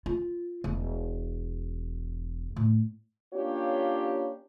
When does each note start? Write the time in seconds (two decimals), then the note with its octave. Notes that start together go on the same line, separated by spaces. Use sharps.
0.06 F4
0.64 E1
2.56 A2
3.34 A#3 C#4 D4 F4 G4 C#5